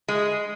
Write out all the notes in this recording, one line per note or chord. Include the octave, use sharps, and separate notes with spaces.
G#3